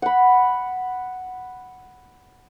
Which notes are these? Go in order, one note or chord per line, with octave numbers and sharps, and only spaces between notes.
F#5 B5